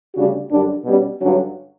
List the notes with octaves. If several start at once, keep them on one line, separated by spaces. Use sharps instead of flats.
D2 C#3 G3 D4 F#4
F#2 D3 G3 D4
B2 G3 C#4
G2 D3 F#3 C#4 F#4